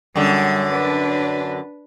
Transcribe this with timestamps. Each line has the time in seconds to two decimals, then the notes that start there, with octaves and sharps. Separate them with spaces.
0.16 F#2 D3 G3
0.71 D4 B4